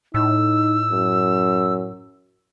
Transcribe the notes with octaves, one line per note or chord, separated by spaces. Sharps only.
A2 D#4 E6
F#2